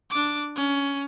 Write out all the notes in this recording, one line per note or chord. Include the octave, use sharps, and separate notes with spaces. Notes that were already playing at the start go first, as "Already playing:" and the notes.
D4 D6
C#4